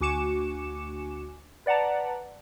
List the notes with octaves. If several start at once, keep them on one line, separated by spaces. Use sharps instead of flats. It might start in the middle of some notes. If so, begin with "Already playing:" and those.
D2 F#4 G#5 D6 C#7 E7
B4 D5 F#5 A5 A#5